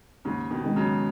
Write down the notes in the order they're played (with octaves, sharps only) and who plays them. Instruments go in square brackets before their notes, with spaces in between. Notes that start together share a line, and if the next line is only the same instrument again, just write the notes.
[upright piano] D#2 [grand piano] G#2 C#3
[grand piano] B2 D#3
[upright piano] D#3 G#3 D#4
[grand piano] C#3 F#3